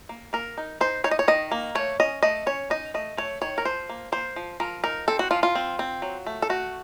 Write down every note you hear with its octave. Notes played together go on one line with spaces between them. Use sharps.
A#3
A#3 A#4
D#4
D#4 C5
D#4 C#5
D#5
C#5
D#3 D#5
A#3
A3 C#5
C#4 D#5
A3 D#5
C#4 C#5
D#4 D#5
A3 D#5
A3 C#5
D#3 C#5
A#4
F3 C5
A#3
A#3 C5
F3
F3 A#4
D#4 A#4
C4 A4
F#4
F3 F4
F4
C4
C4
F#3
A3
A4
A3 F#4